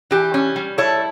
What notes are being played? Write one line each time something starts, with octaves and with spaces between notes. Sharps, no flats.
E3 G4
C#4
G3
E4 A4 C#5